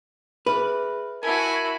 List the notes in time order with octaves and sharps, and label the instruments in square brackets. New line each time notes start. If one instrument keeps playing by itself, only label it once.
[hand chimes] G#4 E5 F6 [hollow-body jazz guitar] B4
[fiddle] E4 F#4 [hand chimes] A#4 A5 [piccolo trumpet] G#5